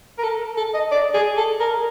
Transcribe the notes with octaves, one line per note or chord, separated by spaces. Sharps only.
A#4
A4
A4
D#5
D5
G#4
A4
A#4